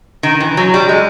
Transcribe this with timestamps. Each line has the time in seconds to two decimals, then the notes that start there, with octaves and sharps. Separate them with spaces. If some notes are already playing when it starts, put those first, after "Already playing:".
0.23 D#3
0.40 E3
0.57 F#3
0.74 G3
0.89 G#3